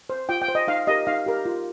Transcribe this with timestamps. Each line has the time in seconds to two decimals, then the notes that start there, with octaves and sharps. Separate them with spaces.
0.10 C5
0.29 F4 G5
0.42 G5
0.48 C5
0.55 D#5
0.68 D#4 F5
0.87 G4 A#4 D#5
1.07 D#4 F5
1.26 G4 A#4
1.46 F4